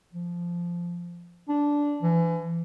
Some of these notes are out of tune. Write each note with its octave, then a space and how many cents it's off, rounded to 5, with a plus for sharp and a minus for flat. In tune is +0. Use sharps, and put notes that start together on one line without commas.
F3 -10
D4 -10
E3 +30